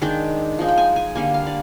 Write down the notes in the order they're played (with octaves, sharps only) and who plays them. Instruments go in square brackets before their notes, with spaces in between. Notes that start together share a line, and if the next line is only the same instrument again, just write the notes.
[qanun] D#3 G#3 D4 G5
F3 G#3 D#4
G5
G#5
G#5
D3 G3 A#3 G#5
F5
D5